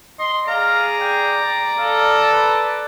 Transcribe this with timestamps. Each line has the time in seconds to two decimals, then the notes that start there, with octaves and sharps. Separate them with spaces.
0.19 D#5 C6
0.48 G#4 D5 F5 A#5
1.01 G5
1.78 A4 F5
2.32 B4